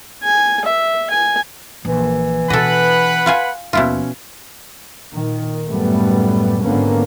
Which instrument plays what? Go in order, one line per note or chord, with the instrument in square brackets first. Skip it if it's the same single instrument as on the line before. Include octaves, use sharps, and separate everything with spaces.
[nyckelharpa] G#5
E5
G#5
[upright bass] A#1 [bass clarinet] E3
[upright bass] B2 D4 [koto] A4 D#5 [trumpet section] B4 F#5 B5
[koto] F4 F5 G#5
[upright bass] D#2 F3 [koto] B2 E4 F4 [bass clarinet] C#4
[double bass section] A#2 D#3
F#2 A2 G3 A3 B3
G#1 D3 A#3 B3 C#4